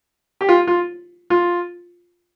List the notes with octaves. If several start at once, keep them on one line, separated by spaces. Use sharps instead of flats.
G4
F4
F4
F4